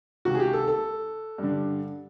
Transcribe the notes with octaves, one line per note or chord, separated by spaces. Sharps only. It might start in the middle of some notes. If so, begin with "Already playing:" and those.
C#2 C3 D#3 F#4
G#4
G4
A4
A4
G2 D3